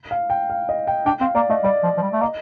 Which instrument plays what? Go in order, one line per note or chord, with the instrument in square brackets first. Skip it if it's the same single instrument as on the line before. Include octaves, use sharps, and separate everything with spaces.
[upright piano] F5
G5
F5
D#5
G5
[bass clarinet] D4 [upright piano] G5
[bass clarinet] C4 [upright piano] F5
[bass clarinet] A#3 [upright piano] D5
[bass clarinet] A3 [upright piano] D#5
[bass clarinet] G3 [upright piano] D5
[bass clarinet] F3
F3
G3
A3
[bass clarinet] A#3 [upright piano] D#5